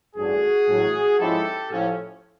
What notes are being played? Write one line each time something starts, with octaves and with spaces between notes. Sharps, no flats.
A1 G2 E3 A3 D4 F#4 G#4
A1 A2 F#3 A3 C#4
G#2 F3 G#3 C#4 E4 G4 A4
A2 F3 A3 C#4